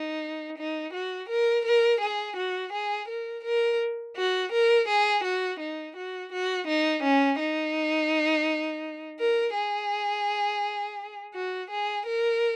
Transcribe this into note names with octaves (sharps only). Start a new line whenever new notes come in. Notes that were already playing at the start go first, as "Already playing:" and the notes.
Already playing: D#4
D#4
F#4
A#4
A#4
G#4
F#4
G#4
A#4
A#4
F#4
A#4
G#4
F#4
D#4
F#4
F#4
D#4
C#4
D#4
A#4
G#4
F#4
G#4
A#4